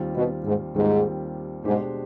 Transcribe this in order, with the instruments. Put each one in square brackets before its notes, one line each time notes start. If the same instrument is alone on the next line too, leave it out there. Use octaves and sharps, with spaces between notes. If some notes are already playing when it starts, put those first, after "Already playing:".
Already playing: [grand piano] D#2 D#3 G3 C4 F4
[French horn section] B2
G#2
[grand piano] D#2 D#3 G3 C4 F4 [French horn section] G#2
[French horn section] G#2 [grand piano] B2 G#3 D4 G4 C5